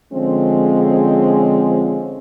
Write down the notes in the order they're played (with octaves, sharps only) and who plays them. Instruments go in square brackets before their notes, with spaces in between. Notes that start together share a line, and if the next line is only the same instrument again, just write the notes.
[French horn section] D3 F3 G#3 C4 C#4